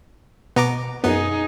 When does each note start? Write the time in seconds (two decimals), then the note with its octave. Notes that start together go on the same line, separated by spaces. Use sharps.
0.56 B2 B3 A#5 D6
1.03 A#1 F#2 B3 D#4 G#4